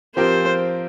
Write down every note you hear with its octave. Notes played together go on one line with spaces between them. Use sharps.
F3 C4 G4 A#4 C5